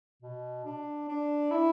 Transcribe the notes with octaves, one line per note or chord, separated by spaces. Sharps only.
B2
D4
D4
E4